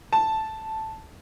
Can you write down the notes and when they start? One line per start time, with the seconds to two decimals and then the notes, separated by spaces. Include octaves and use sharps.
0.13 A5